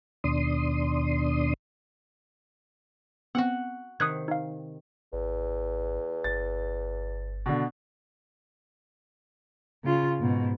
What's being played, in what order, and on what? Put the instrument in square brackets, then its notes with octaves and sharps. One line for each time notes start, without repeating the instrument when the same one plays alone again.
[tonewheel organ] D#2 B2 D4 C6 D#6
[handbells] B3 C4 [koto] F#4 F#5
[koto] C3 D#3 [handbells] D#6 F#6 G#6
[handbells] D#4 F5
[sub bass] G#1 [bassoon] E2
[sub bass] G1 [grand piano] A6
[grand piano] B2 D3
[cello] C#3 F4
G#2 B2